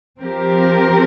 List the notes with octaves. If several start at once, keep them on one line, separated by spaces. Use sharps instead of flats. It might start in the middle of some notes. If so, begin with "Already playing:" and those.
F3 C4 G4 A#4